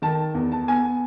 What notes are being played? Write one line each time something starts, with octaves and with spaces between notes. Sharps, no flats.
D#3 A5
E2
A5
B3 G#5